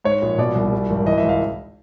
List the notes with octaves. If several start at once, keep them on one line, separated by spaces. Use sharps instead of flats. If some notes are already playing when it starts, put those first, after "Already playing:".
G#2 C#5
A#1
B2 D5
C2
G3
G#1
E3 D#5
E5
C#2
F5